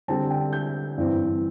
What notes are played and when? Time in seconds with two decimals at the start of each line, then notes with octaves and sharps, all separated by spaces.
0.08 D3 G3 C4 A5
0.30 G5
0.53 G6
0.97 G2 E3 C4